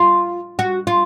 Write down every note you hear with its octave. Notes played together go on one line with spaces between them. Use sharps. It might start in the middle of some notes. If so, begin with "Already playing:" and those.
Already playing: F4
F#4
F4